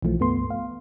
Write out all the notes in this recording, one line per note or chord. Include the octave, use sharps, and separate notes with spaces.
B1 E3 F3 A3
C#2 G2 A3 B3 C6
F5